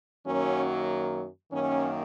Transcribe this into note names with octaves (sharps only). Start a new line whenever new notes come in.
F#2 D#3 F#3 A#3 C#4
F#2 D#3 A#3 C#4